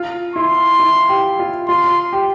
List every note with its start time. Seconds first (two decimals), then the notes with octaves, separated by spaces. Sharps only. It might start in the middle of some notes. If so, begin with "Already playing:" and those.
Already playing: F4
0.35 E4 C6
0.79 E4
1.09 G4
1.39 F4
1.68 F4 C6
2.13 G4